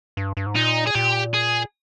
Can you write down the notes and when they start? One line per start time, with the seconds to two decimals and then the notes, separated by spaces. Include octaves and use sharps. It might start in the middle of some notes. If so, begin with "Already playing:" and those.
0.17 G2
0.37 G2
0.46 G#2
0.56 A#2 D#4
0.87 G#4
0.95 A#2 G4
1.34 G#4